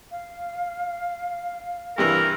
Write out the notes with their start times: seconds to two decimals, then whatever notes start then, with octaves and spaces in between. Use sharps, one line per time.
0.11 F5
1.98 G2 C3 E3 A#4